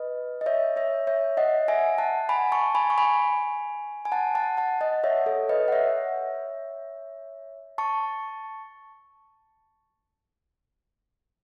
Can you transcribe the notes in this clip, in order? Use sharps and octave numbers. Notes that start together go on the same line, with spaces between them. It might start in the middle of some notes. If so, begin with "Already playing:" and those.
Already playing: B4 D#5
D#5
C#5 E5
C#5 E5
C#5 E5
D#5 F#5
E5 G#5
F#5 A5
G#5 B5
A5 C#6
G#5 B5
C#6
G#5 B5
G#5
F#5 A5
F#5 A5
F#5 A5
D#5 F#5
C#5 E5
A4 C#5
B4 D#5
F#5
C#5 E5
A5 C#6